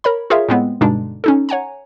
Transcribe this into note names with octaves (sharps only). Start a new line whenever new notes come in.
A#4 C#5 B5
F4 G#4 A#4 C#5 E5 F5
A2 G#3 B3 C4
G2 B2 D3 G#3 D4 D#4
C#4 D#4 A4
C#5 F#5 G#5 A#5